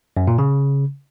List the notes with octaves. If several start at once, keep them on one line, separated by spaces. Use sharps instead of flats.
F#2
A#2
C#3